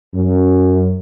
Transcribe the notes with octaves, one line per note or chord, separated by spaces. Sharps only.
F#2